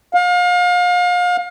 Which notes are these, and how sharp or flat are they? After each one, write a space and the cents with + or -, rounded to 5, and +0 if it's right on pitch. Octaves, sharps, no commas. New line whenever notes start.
F5 +35